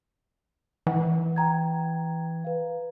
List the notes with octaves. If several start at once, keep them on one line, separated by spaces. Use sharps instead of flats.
E3 F#5
G5 A#5 G#6
B4 F5